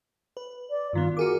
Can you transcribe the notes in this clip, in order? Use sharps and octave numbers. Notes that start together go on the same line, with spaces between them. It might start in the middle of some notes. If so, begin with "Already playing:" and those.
B4
D5
G2 D#3 B3 F4
F#4 G#4 A#4 D6